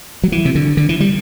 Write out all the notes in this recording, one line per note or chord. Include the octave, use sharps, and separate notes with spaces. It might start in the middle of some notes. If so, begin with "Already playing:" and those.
F#3
E3
C3
D3
D3
E3
G3